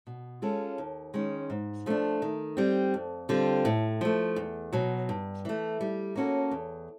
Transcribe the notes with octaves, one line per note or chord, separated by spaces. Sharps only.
B2
G#3 C#4 F4 A4
D#2
D#3 G#3 C#4
G#2
F3 A3 D4
D#3
G3 C4
F2
D3 G3 C4 F4
A2
F3 A3
E2
B2 F#3
G2
E3 A3
G3
A#3 C#4 F#4 A4
E2